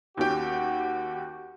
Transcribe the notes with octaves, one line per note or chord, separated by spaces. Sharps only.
D#2 C#4 F#4 G4